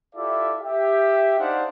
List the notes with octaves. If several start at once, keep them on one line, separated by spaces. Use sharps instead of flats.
E4 F4 G4 A4 D5 E5
G4 E5
D4 D#4 C5 F5 F#5